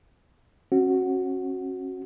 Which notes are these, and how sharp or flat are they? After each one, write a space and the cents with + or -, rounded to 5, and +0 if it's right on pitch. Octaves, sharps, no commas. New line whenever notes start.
C#4 -35 F#4 +0